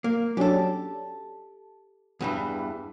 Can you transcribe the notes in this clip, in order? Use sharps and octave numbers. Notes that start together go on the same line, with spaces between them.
A#3
F#3 C#4 D4 G4 A4
E2 G2 E3